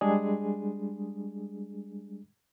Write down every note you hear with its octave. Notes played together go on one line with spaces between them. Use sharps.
G3 G#3 D4 G#4